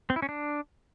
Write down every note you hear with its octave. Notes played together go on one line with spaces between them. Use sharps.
C4
E4
C#4
D4